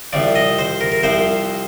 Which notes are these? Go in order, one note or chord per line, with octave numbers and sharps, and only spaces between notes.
C2 C3 F3 D5
D#5
C5
A#4
A#4
C2 C3 F3 C5